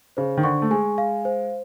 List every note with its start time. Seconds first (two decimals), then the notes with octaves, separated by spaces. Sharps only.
0.17 C#3 C5
0.37 D#3
0.44 D3 C#6
0.62 A3
0.70 G#3 G#5
0.98 F5
1.25 C5